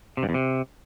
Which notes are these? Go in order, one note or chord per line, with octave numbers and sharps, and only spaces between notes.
C3
G2
E2
C3